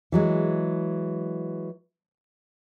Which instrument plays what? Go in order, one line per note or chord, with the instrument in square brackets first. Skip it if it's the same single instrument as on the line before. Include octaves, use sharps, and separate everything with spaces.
[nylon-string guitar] E3 F#3 G#3